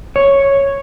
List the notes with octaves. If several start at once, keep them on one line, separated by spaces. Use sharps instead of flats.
C#5